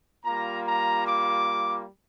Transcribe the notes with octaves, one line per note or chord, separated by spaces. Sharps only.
G3 A#3 F4 A#5
A#5
D6